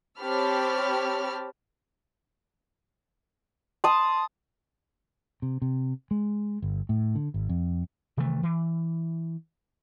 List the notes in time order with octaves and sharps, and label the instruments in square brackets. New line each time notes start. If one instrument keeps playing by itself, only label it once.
[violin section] C4 G4 C#5 A5 B5 F6
[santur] A5 D#6 [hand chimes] C6
[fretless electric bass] C3
C3
G#3
G1
A2
D3
G#1
F2
[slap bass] C3 D#3 E3 A3
E3